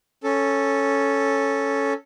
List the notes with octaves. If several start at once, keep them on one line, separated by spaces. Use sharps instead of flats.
C#4 A4